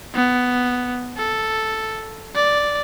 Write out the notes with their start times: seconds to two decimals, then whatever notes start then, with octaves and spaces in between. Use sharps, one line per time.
0.15 B3
1.18 A4
2.36 D5